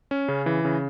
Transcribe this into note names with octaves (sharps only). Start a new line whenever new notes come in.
C#4
C#3
E3
C#3